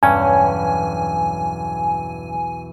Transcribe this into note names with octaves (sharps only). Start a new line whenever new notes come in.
B1 E2 G2 C#4 G#5